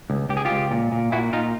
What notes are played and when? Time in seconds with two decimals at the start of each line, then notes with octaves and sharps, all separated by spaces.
0.10 C#2
0.29 C#2 G4
0.37 G#4
0.45 F4 G4
0.51 C#2
0.71 A#2
0.92 A#2
1.12 A#2 E4 F#4
1.33 A#2 D#4 F4